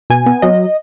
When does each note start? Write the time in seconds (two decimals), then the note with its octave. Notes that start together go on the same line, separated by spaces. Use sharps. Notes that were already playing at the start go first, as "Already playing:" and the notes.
0.10 B2 G#5
0.26 B3
0.42 F#3 D#5